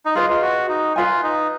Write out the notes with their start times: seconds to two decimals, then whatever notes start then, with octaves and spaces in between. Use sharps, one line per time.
0.06 D#4
0.15 F4 G#4 B4 D#5
0.30 F4
0.42 F#4
0.69 D#4
0.96 F4 B4 F5 G#5
1.23 D#4